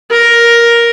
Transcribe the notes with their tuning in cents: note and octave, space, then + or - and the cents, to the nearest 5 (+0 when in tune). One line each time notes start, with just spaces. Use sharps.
A#4 +10